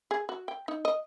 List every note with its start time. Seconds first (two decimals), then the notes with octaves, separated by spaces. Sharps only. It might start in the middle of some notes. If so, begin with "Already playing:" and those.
0.11 G#4
0.29 F#4
0.48 G5
0.68 D#4
0.85 D#5